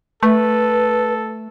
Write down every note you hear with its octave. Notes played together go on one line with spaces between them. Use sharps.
A3 A4 B4